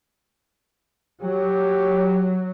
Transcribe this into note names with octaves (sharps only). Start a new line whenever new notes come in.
F#3 G4